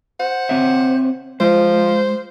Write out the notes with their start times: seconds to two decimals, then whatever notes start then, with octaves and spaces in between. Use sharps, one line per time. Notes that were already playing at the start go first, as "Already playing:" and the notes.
0.20 C5 F#5
0.49 C4 C#5 E5
1.40 F3 G#3 C5